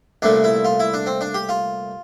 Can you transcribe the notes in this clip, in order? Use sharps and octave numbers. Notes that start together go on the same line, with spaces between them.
C2 A#2 A3 D4
E4
F4
E4
D4
C4
D4
G4
F4